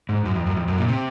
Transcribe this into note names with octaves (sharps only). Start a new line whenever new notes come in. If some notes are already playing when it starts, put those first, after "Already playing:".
G#2
F#2
F2
F#2
F2
F#2
A#2
C3